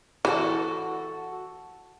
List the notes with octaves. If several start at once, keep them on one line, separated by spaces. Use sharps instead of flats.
E3 F#4 G4 A4